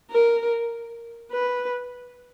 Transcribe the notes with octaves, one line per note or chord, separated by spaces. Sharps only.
A#4
B4